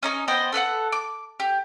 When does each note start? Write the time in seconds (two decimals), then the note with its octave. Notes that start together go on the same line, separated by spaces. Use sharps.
0.03 C#4 D#4 D#5
0.28 B3 C5 D#5 G5
0.52 A4 B4 C#5 F#5
0.92 D6
1.40 G4